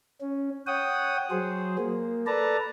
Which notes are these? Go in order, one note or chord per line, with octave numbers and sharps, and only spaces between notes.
C#4
C#5 F#5 G5 D#6
F#3 G#4 C5
A#3
A4 B4 D5 A5 A#5